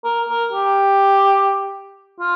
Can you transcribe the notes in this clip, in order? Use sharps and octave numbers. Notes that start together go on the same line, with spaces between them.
A#4
A#4
G4
F4